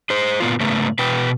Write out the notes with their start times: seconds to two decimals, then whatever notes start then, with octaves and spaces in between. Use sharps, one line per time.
0.10 G#4 C5
0.40 A#2 B3 F4
0.60 G#2 C#3 A3 B3
0.99 B2 B4 G5